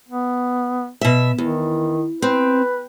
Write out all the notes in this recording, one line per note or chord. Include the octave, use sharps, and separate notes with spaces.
B3
B2 E5
E2 D#3
C4 B4